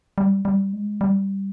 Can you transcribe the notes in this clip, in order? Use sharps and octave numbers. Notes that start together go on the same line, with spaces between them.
G3
G3
G#3
G3